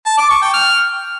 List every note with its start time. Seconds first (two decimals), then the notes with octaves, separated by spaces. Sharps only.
0.06 A5
0.18 D6
0.30 C#6
0.42 G5
0.54 F6